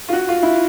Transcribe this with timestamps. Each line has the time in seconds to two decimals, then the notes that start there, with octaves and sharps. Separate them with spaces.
0.09 F4
0.13 F#4
0.29 F4
0.43 E4